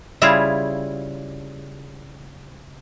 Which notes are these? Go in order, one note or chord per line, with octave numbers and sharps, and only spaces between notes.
C#3 G3 E4 F4 G#4